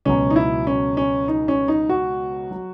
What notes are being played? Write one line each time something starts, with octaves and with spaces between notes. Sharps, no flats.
C#2 B2 F#3 C#4
D#4
E4
C#4
C#4
D#4
C#4
D#4
F#4
F#3